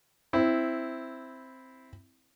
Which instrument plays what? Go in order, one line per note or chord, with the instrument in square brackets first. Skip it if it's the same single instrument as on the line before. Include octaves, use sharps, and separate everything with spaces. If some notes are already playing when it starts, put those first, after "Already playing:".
[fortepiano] C4 E4